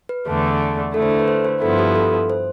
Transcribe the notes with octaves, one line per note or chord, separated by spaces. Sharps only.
B4
E2 D3 A3 D4
D3 A3 E4 A4
C5
A4
B4
C5
C5
G2 F3 B3 E4 A4
G4
A4
C5